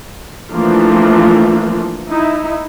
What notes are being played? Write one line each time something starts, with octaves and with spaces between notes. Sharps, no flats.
E3 F3 A3 A#3 D4 F4
D#4 E4